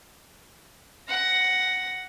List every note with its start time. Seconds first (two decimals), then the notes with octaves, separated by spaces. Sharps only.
1.08 F#5 A#6